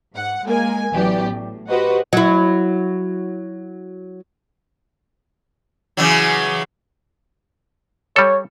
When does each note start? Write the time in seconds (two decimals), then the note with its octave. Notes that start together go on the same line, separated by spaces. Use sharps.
0.14 G#2 F#5
0.45 G#3 A#3 G#5
0.93 A1 E3 F#3 B3 G4 D5
1.31 A2
1.69 F#4 G4 B4 C5 D#5 F#5
2.13 F#3 E4
5.97 C#3 E3 F#3
8.16 G3 A4 C#5